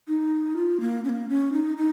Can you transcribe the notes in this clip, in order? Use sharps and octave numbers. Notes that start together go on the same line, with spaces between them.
D#4
F4
A#3
C#4
A#3
C#4
D#4
D#4